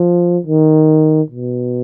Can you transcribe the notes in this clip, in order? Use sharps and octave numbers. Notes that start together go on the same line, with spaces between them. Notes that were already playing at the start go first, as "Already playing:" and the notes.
Already playing: F3
D#3
B2